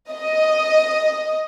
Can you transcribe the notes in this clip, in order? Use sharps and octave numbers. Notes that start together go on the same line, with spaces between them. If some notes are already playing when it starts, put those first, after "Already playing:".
D#5